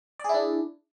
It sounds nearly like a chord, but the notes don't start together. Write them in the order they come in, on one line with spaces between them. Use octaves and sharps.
D5 G#4 E4 D4